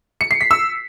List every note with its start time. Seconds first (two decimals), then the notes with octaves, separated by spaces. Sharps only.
0.21 C#7
0.31 C7
0.41 B6
0.51 E6